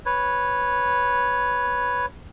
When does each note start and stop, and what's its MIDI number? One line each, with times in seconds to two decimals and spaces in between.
0.06 2.06 71
0.06 2.06 73